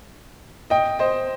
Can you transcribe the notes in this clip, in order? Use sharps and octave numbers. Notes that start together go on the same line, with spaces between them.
D#5 G5
C5 D#5